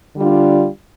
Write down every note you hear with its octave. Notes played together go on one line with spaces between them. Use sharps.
D3 G3 D4 F4